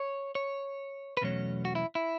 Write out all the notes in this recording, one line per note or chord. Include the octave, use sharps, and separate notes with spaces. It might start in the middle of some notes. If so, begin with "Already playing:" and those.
Already playing: C#5
C#5
B4
E2 B2 F#3 A3 C#4 C#5
F#4
E4
E4